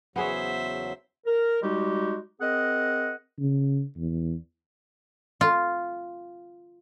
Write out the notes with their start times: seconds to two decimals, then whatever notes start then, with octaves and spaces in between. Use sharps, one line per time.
0.16 E2 C#3 F#3 B3 G#4 C5 C#5 E5
1.27 A#4
1.63 G3 G#3 D#4 F#4 G4
2.40 C4 G#4 A#4 D#5 F#5
3.39 C#3
3.97 E2
5.41 F4